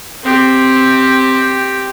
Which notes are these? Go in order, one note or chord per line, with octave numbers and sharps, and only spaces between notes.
C4 G4